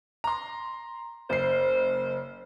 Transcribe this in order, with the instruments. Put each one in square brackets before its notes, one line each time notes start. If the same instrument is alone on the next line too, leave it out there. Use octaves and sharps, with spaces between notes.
[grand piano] A#5 C6
[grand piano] F#1 C7 [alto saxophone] C5